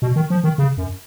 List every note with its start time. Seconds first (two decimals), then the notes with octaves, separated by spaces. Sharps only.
0.02 B2
0.16 D#3
0.30 F3
0.44 D#3
0.58 C#3
0.77 F#2